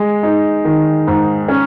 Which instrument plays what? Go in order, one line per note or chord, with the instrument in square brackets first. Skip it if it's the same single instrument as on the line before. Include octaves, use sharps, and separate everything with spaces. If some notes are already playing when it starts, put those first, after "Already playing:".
Already playing: [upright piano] G#3
D#4
D#3
G#2
C#4